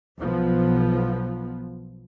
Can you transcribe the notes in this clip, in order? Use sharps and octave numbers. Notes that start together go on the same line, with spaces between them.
B1 F3 B3